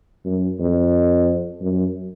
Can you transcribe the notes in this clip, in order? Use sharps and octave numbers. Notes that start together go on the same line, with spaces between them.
F#2
F2
F#2